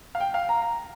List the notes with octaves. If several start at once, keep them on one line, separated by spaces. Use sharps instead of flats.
F5
G5
F5
A#5
A#5